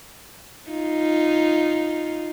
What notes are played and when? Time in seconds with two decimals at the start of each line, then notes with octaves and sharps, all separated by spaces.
0.70 D#4 F4